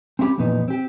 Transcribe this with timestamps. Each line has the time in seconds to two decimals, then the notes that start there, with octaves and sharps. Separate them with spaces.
0.19 C4 C#4 E4 G4 B5
0.38 F2 A#2 E3 B3 D#4
0.68 C4 G4